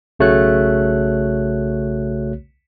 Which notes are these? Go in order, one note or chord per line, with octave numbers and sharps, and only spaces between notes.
B1 C#3 A3 F#4 C#5 F#6